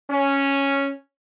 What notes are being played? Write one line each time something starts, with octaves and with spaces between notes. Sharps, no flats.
C#4